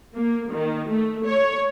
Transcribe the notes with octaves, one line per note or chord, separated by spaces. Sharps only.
A#3
D#3
A3
C#5